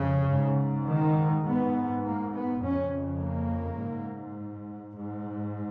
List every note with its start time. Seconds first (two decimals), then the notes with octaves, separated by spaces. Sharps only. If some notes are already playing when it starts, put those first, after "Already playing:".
Already playing: F2 C#3
0.31 G#2
0.89 D#3
1.47 G#2 B3
2.06 A#3
2.35 B3
2.64 F2 C#3 C#4
3.22 A#3
3.80 G#2
4.97 G#2